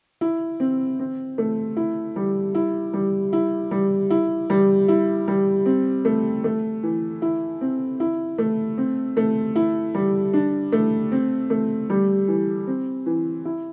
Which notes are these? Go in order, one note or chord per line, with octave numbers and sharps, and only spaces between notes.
E4
C4
C4
A3
E4
G3
E4
G3
E4
G3
E4
G3
E4
G3
C4
A3
A3
E3
E4
C4
E4
A3
C4
A3
E4
G3
D4
A3
C4
A3
G3
E3
C4
E3
E4